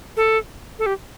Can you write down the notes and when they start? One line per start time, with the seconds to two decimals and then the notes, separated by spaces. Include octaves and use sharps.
0.17 A4
0.79 A4
0.86 G4